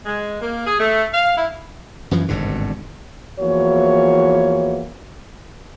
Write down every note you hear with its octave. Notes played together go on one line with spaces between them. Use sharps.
G#3
A#3
G#4
A3
F5
E4
F#2 E3 F3
G#1 G2 B2 D3
E2 E3 F3 A#3 F#4 C#5